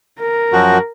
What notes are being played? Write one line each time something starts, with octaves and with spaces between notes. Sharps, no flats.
A#4
F#2 F3 F#4